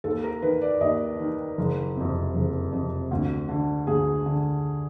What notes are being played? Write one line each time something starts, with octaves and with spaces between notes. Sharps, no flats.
D#2 A4
A#4
D#3 B4
D5
D#2 D#5
D#3
F#1
F2 C3
F#1
F2 C3
D2
D3
D2 G#4
D3